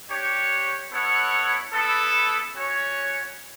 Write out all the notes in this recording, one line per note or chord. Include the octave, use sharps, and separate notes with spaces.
D4 G4 C#5
B3 E4 A4 C#5 F#5
B3 E4 A4
C#4 F#4 C#5